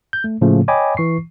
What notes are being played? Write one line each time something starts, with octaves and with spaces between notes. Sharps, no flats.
G6
A3
A2 C#3 F3 A3 A#3
C#5 D#5 G5 G#5 B5 D6
E3 C#6 C7